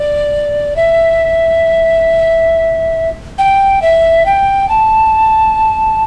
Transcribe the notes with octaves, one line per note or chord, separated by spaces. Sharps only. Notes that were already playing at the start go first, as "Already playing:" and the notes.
Already playing: D5
E5
G5
E5
G5
A5